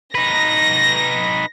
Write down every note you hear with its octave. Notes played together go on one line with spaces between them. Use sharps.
D#4 B4 A#6